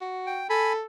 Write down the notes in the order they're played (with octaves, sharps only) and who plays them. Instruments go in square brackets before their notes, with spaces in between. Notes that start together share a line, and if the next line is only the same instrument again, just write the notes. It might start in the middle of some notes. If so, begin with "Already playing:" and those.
[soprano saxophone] F#4
[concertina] G5
[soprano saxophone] A4 [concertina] G#5 B5